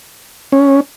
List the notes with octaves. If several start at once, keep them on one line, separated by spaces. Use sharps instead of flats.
C#4